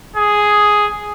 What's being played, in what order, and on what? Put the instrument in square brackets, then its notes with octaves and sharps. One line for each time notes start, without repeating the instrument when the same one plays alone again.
[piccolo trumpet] G#4